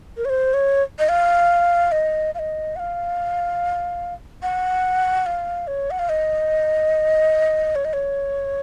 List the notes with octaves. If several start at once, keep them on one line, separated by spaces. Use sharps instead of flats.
A#4
C#5
C5
C#5
D#5
F5
D#5
F5
D#5
F#5
F5
F#5
F5
C#5
F#5
F5
D#5
C#5
D#5
C#5